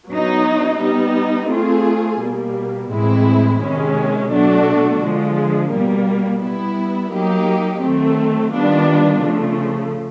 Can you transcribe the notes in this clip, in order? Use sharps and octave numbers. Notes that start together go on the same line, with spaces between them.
F#3 B3 D#4
G3 B3 D#4
A3 C4 F4 G#4
B2 G3 A#3
A2 E3 G#3 C4 E4
C3 D#3 G#3 C#4
B2 F#3 A3 D4 F#4
D3 F3 G#3
B2 G3 A#3
G3 B3 E4
F#3 A#3 D#4 G4
D#3 F#3 A3 C4
D#3 G3 B3 D4 F4
C#3 F3 A3